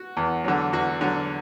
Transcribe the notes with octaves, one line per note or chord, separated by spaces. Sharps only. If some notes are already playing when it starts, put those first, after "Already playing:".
Already playing: F#4
E2
D3 F#3
E2 F#4
D3 F#3